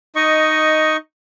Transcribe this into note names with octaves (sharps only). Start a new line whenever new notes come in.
D#4 D#5 C#6